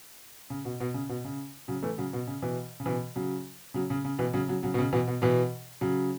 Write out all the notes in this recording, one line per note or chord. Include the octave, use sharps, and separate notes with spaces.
C#3
B2
B2
C#3
B2
C#3
C#3 F#3
E3 A3
C#3 F#3
B2
C#3
B2 E3
C#3
B2 E3
C#3 F#3
C#3 F#3
C#3
C#3
B2 E3
C#3 F#3
C#3 F#3
C#3 F#3
B2
C#3
B2 E3
B2
B2 E3
C#3 F#3